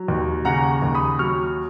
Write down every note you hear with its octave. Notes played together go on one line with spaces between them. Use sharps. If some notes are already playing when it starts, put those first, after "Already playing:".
Already playing: F#3
D#2
C#3 F#5 A#5
D#2
B5 D#6
F#3 C#6 F6